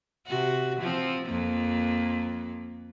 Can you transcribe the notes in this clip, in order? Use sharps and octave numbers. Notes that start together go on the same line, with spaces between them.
C3 F#4
F3 C4
F2 A#3